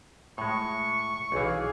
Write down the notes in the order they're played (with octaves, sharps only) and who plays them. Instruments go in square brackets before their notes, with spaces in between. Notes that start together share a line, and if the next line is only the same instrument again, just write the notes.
[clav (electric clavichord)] A2 G#3 [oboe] C#6
[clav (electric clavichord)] B1 E3 [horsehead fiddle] G#4 F5